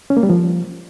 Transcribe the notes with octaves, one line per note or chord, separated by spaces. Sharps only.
C#4
A#3
G3
F3